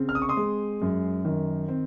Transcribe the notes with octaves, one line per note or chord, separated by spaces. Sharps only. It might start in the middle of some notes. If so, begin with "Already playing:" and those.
Already playing: C#3 C4
F6
D#6
C#6
C6 D#6
G#3
F#2
D#3
C4